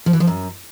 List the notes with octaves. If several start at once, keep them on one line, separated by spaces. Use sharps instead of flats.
F3
E3
F3
F#2